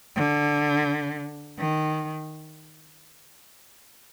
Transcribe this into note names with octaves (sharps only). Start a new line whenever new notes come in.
D3
D#3